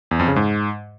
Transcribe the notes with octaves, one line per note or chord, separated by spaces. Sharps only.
E2
F2
C#3
G#2